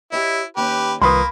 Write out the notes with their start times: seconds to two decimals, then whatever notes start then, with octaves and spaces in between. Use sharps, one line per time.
0.12 E4 G4 C#5 D#5
0.57 D#2 C#4 G4 B4
1.02 C2 D#3 A#3 F4 B4 B5 C6 D#6